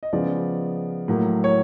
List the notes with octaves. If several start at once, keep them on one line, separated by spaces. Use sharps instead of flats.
D#5
C#3 F3 G#3 B3 D5
A2 F#3 A#3
C#5